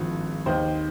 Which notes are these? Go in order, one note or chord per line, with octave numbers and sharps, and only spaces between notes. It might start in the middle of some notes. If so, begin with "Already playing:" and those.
Already playing: G#1 G2 F3
D#2 D#3 C5